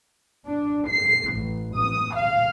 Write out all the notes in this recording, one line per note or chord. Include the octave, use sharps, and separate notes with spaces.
D4
C7
A1
D#6
F5